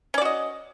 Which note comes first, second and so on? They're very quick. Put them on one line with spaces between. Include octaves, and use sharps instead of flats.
C#4 D5 F#4 D#5